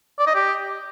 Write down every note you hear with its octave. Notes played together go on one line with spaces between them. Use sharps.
D5
D#5
G4